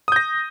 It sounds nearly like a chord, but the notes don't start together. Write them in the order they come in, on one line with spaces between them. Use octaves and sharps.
D#6 G6 A#6